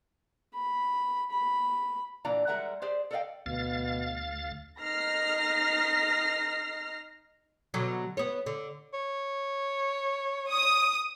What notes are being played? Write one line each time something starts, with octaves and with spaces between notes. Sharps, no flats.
B5
B5
A#2 E3 A#3 D4 D5 A#5
G3 G#3 A#4 E5 F#5 A#5
G4 G#4 C5 D5
A4 A#4 D5 D#5 F5 G5
D2 B2 F5 A6
D#4 F6 A#6 C7
B2 D3 F#3
B3 C#5
D3
C#5
D#6